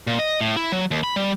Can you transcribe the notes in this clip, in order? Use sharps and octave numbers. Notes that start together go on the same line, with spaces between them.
A#2
D#5
A2
E4
F#3
D#2
B5
G3